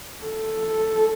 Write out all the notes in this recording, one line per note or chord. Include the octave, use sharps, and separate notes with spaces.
A4